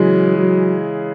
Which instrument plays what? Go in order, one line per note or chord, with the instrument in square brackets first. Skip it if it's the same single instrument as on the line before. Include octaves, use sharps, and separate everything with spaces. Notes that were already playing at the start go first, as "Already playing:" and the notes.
Already playing: [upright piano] C#3 E3 G#3 [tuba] F#3
[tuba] F#3